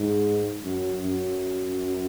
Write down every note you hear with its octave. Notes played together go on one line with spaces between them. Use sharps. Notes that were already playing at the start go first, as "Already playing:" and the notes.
Already playing: G#2
F#2
F#2